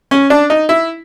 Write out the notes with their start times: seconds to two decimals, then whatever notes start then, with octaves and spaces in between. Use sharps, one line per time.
0.11 C#4
0.30 D4
0.50 D#4
0.69 E4